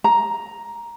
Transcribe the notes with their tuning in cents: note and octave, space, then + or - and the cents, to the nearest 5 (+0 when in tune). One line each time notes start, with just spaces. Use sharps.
A#5 +5